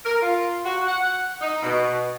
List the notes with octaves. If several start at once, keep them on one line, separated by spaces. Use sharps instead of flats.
A#4
F4
F#4
F#5
D#4
B2